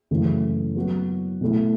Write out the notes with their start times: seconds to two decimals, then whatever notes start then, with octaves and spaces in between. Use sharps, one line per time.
0.11 F#2 C#3 E3 A3
0.76 F#3 B3 F#4
1.41 B2 A3 E4